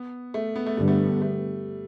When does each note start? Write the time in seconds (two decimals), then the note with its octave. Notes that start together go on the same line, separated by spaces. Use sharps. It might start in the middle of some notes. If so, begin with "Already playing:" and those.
Already playing: B3
0.34 A3
0.56 B3
0.66 A3
0.77 G1 G2 D3 G3 B3
0.88 A3
1.22 A3